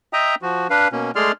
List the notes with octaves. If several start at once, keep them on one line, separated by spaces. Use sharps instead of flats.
D#5 E5 G5 A#5 D#6
F3 F#4
D4 B4 F5
B2 A#3 C#4
G#3 A3 G#4 D5 C6 F6